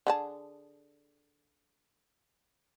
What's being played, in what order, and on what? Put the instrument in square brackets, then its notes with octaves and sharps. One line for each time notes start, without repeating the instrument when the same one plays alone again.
[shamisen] D3 G#4 A5